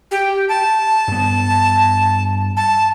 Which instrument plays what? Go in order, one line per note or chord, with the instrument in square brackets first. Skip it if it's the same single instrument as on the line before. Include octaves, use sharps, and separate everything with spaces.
[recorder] G4
A5
[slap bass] G2 B3
[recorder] A5